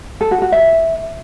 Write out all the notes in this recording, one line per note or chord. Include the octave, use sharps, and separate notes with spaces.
A4
F#4
F#4
E5